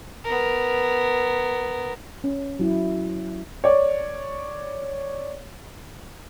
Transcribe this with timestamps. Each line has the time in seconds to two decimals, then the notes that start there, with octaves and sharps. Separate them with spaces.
0.25 B3 A#4
2.24 C#4
2.59 F#3 E4
3.64 C#5 D5